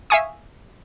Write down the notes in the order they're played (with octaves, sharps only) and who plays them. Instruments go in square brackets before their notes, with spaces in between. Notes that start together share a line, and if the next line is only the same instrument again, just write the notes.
[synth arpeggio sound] E5 F5 G#5 C#6 D#6